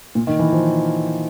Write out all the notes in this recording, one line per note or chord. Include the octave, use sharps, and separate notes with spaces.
A#2
D#3
E3
F3